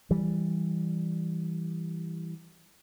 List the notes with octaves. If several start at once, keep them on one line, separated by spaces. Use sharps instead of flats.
E3 G3